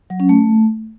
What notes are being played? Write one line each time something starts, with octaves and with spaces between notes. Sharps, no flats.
F#3
C#4
A3